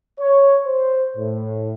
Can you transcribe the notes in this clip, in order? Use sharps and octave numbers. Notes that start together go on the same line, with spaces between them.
C#5
C5
A2